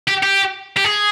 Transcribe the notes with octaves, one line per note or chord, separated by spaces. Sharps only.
G4
G4
G4
G#4